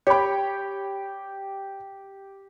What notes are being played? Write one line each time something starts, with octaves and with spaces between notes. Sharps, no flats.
G4 C#5 G5 B5